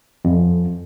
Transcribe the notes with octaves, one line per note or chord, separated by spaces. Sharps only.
F2